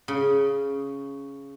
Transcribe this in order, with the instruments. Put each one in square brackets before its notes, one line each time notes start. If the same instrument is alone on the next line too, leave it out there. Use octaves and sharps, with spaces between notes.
[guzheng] C#3